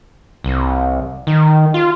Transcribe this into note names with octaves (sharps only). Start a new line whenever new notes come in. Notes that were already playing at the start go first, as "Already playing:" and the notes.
C2
D#3
F4